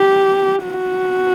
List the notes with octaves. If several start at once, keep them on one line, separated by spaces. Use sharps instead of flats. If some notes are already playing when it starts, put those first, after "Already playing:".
Already playing: G4
F#4